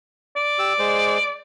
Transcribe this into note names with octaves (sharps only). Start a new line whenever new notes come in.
D5
G4 E6
G#3 C5